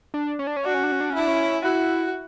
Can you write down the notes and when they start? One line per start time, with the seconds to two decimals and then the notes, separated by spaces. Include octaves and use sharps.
0.14 D4
0.39 C#4
0.47 D4
0.56 C#4
0.64 D4 F#4
0.74 C#4
0.83 D4
0.92 C#4
1.01 D4
1.10 C#4
1.14 D4 E4
1.28 C#4
1.64 E4 F#4